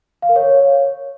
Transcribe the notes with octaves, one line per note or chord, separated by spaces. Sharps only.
F5
A#4
C#5